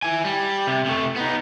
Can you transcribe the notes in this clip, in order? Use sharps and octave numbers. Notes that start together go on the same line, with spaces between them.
E4 G#5
G3
C3
C3 A3
B3 D#4